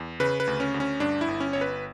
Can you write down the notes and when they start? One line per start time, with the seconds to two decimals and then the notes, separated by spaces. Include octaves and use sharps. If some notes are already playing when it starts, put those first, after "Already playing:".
Already playing: E2
0.20 C#3 B4
0.40 B4
0.47 D2
0.60 C#4
0.74 D2
0.80 C#4
1.00 G2 D4
1.21 E4
1.28 G1
1.40 C#4
1.53 G1 C#5
1.61 B4